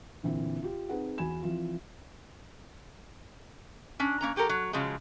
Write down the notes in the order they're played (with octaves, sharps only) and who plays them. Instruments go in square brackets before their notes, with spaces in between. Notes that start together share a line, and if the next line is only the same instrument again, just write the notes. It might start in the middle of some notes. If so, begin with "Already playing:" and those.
[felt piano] A#2 D3 E3 C4
F4 G4
C4 D#4 G#4 B4 F#5
E2 F#4 G#5 B5 E7
E3 F3 C4 F4
[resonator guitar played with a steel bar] C#4 D4
A#3 C#4 A#5
F#3 G4 A4 A#4
F#3
C#3 F3 F#3 G#3